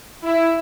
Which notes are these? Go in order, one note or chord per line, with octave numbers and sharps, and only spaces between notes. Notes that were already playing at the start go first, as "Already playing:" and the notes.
E4